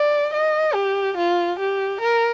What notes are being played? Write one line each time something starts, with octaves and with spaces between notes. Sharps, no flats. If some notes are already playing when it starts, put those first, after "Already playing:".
Already playing: D5
D#5
G4
F4
G4
A#4